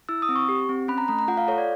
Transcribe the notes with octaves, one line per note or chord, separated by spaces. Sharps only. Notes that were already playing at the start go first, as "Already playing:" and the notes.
E4 E6
D#6
C4
C#6
G4
C4
C#4 B5
A#5
A3 A#5
A#5
F4 F#5
F5
A4 C#5
D5